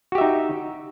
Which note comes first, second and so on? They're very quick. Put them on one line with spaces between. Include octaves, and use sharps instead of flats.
F#4 G4 E5 D#4